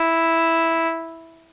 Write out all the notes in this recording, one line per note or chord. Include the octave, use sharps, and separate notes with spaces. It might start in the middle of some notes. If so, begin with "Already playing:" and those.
Already playing: E4